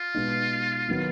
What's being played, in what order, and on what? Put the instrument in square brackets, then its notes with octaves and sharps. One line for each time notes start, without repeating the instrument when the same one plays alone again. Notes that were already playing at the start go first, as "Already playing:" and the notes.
Already playing: [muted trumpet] F4
[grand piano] B2 G#3 D#4
D#3 F#3 B3